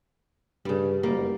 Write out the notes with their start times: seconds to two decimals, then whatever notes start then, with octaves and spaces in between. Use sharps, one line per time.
0.65 G2 C#3 G3
1.03 F#1 G3 A#3